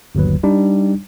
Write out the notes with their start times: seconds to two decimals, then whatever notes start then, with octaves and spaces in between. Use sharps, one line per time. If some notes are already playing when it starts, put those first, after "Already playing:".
0.15 G1 D#2 F#3 B4
0.43 G3 D4 D#4